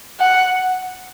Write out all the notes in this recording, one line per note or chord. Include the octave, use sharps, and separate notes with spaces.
F#5